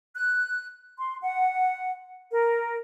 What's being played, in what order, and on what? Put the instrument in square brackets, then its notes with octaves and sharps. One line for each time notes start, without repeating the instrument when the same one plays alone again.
[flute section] F#6
C6
F#5
A#4